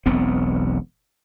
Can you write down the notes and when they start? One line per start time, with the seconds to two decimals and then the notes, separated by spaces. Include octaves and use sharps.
0.06 E1 B1 B3 C4